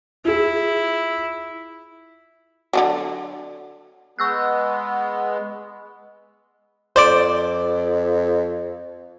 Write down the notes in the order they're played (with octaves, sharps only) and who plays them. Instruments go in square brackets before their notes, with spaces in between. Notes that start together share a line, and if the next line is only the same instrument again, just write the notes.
[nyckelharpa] E4 [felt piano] F4 G#4
[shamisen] D3 D#3 F#3
[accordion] G#3 B3 [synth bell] C#6 E6 F#6
[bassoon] F2 [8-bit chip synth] C5 D5 D6